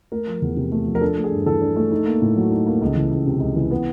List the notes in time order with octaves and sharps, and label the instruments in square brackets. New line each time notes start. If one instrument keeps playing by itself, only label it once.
[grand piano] A3 A#4
F3
E2
C3
A3
F3
A#4
D4 A4
A3
G#4
G2
E3 A4
D4
A3
D#4
A#3
A2
F#3
D#4
A#3
C#2
E3
C#2
C3
C#2
E3
B3